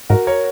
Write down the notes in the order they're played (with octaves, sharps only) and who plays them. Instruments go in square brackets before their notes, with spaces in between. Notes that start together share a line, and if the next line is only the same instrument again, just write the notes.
[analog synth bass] G#2 [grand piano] F#4 A#4
[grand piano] A#4 C#5